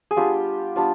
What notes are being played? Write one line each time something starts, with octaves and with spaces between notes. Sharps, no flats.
G#4
G3 B3 D4 F4 G4
G3 B3 D4 F4